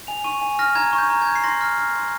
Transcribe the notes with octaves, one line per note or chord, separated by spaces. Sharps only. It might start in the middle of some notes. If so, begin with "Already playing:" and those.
G#5 F7
C#6 D#7
G#5
F6 A#6
A#5 G#6
C#6
G6
A#5
G#6
G6
C7
C6 A#6
F6
F6
C6